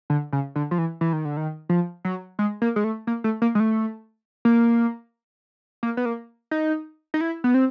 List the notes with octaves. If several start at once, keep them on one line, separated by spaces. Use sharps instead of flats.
D3
C#3
D3
F3
E3
E3
D#3
D3
D#3
F3
F#3
G#3
A#3
G#3
A3
A#3
A3
A#3
G#3
A3
A#3
A#3
B3
A#3
D#4
D#4
E4
B3
C4